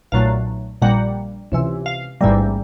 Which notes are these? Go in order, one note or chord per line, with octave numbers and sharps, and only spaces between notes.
B1 A#2 F#3 A3 F5
A#1 A#2 G3 A#3 F#5
C#2 C3 E3
F5
A1 G#2 E3 G3 A#3